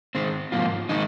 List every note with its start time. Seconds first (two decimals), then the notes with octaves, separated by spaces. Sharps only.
0.15 D#3 G#3 C4
0.52 G#2 F3 A#3 F4
0.89 D#3 G#3 D#4